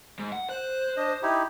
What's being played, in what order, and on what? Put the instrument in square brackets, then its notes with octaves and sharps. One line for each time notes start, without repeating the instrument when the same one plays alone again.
[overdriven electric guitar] G#2
F#5
[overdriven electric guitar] C5 [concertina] F#6
[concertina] D4 D#5
D#4 E4 G4